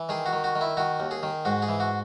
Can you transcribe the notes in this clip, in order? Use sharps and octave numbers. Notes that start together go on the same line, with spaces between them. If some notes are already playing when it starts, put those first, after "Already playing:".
Already playing: E3
D#3 G#4
F#4
D#3
F#4
D#3
E4
D#3 F#4
D#2
G#4
D#3
G#2 F#4
G#4
E3
F#4